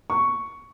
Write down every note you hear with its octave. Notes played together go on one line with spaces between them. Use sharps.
C#6